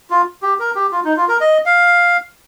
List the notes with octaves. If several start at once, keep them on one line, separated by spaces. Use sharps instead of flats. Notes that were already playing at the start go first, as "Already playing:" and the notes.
F4
G4
A#4
G4
F4
D#4
F4
A#4
D#5
F5